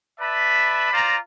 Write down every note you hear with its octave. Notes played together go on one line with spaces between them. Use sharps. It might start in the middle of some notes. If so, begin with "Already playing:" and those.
B4 D5 E5 A5 B5
F4 C5 D5 A#5